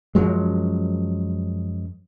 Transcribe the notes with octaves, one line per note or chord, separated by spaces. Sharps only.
F#2 F3 F#3 G#3